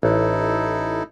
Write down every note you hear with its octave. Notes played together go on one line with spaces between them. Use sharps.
A1 D#4 E4 A4